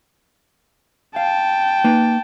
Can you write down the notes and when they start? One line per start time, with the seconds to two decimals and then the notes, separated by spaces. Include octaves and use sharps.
1.16 F5 G5 A5
1.84 A#3 D#4 B4